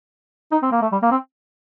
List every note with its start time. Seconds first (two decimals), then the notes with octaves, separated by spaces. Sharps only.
0.52 D#4
0.62 C4
0.72 A#3
0.82 A3
0.92 G3
1.02 A#3
1.11 C4